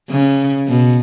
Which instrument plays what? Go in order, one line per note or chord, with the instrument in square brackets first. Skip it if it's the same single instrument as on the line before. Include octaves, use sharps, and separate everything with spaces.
[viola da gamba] C#3
B2